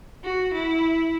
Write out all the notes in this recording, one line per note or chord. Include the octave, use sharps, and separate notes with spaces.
F#4
E4